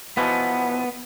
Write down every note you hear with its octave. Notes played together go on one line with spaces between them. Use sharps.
B2 E3 F3 B3